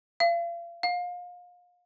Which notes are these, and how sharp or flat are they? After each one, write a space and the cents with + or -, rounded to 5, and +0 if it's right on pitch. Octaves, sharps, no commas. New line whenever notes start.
F5 -35
F5 +30